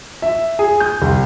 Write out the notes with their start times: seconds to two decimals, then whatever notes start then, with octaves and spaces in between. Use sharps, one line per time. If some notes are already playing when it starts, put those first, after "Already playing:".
0.22 E5
0.59 G#4
0.80 G6
1.02 C2